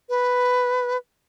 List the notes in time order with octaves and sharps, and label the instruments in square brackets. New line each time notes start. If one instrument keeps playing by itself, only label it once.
[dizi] B4